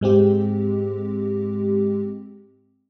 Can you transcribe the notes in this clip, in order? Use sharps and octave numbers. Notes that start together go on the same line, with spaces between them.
G#2 G#3 C4 G4